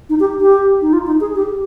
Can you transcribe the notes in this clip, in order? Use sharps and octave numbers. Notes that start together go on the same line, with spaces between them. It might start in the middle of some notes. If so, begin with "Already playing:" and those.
D#4
G4
G4
D#4
F4
D#4
G#4
G4